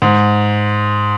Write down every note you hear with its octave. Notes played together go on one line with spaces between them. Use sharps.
G#2